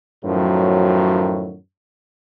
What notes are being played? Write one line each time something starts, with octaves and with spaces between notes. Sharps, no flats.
F#2 A2 D#3 F3 F#3